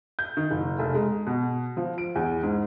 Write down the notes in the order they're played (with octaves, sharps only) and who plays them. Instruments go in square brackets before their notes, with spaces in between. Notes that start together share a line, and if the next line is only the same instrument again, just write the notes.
[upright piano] G6
D#3
F#1
F1
G#3
B2
F3
D7
E2
G#2